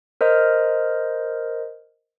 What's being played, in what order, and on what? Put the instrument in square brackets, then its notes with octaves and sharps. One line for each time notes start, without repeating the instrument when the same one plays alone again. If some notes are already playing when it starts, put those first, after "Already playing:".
[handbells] A#4 C5 D#5 F6